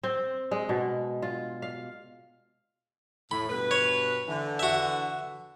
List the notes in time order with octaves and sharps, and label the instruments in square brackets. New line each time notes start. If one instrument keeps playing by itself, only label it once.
[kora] C4
G#3
B2
F4
F5
[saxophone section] A2 [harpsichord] B5
[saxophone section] G2 B2 B4
[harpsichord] C#5
[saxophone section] D3 E3
[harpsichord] F#4 E5